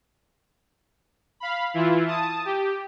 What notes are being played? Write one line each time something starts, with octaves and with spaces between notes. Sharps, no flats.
F5 B5
E3 E4 F4
A5 D#6
G4